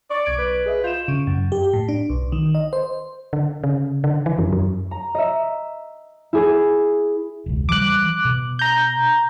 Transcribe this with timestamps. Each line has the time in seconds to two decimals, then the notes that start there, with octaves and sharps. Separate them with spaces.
0.10 D5 C#6 D6 A6
0.25 B1 G#6 D7
0.38 B4
0.66 G#4 D#5 E5
0.84 F4 G6 E7
1.08 C#3
1.27 F#2
1.52 G4
1.73 A2
1.89 D4
2.10 B1
2.32 D#3
2.55 D#5
2.73 C5
3.33 D3
3.64 C#3
4.04 D3
4.26 E3
4.39 F#2
4.53 F#2
4.91 A#5
5.15 D#5 E5
6.33 E4 G#4
7.46 E1 C#2
7.69 E3 F3 G3 D6 F#6
8.25 B2
8.59 A#5 G6